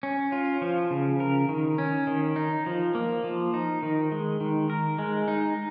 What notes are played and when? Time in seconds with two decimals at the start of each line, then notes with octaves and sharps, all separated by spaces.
0.03 C#4
0.32 F4
0.61 F3
0.91 C#3
1.20 A#4
1.49 D#3
1.78 C#4
2.07 D#3
2.36 D#4
2.66 F3
2.95 A#3
3.24 F3
3.54 D#4
3.83 D#3
4.12 G#3
4.41 D#3
4.70 A#4
4.99 G#3
5.28 D#4